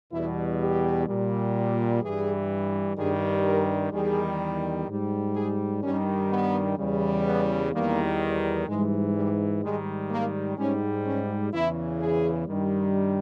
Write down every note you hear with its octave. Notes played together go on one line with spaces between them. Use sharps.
E2 B2 G3 E4
G4
A#2 G3
G2 E3 G3 G#4
G2 D#3 G3 G#4
A#4
E2 D#3 G3 G#4
G#2 G3
G#4
G2 D#3 G3 C#4
B3
E2 C#3 G3
B3
E2 D#3 G3 A#3
G#2 E3 G3 G#3
G3
G#2 D#3 G3 G#3
A#3
G#2 G3 C#4
C#4
E2 C#3 E3 E4
G#4
G2 D#3 G3